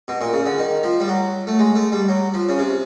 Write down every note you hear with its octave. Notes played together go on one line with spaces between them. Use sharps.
B2
A#2
C#3
D3
D#3
F3
G3
F#3
A3
G#3
A3
G3
F#3
F3
C#3
C3